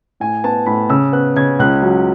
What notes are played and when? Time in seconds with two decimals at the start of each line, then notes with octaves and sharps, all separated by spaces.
0.20 A2 G#5
0.44 B3 A5
0.66 A2 B5
0.89 C#3 E6
1.13 B3 F#6
1.36 C#3 G#6
1.59 C#2 F#6
1.82 F#3